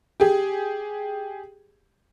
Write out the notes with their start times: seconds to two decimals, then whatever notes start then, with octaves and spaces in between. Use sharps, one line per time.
0.20 G4 G#4